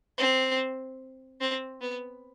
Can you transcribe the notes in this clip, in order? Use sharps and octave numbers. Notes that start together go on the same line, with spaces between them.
C4
C4
B3